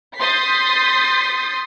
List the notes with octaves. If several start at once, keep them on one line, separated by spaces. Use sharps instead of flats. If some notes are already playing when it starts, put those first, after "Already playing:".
C6 D#6 G6 A6 B6 C7